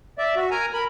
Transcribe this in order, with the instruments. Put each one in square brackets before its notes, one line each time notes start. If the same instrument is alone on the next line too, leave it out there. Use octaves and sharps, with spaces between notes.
[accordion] D5 E5
F#4
A#4 G#5 A#5
A#4 B5